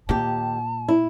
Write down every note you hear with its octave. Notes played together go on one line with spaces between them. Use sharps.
D#2 A#2 G4 A5
E4